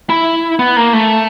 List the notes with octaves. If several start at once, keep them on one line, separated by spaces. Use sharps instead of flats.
E4
B3
A#3
A3